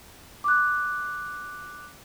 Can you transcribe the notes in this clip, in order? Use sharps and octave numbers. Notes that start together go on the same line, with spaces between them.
D6 F#6